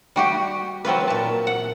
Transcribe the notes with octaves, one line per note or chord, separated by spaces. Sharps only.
G3 F#4 G4
F#3 C4 F4 B4
A#2 A5
F#5